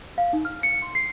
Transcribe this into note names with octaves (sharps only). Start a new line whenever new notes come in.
F5
D#4
F6
C#7
C6
C7